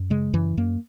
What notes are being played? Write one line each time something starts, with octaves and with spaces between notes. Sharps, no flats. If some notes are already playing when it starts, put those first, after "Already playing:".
Already playing: F#2
C#3 G#3
F#2 E3
F#2 A#3